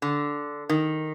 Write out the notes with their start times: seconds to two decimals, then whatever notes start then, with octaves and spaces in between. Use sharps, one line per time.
0.02 D3
0.69 D#3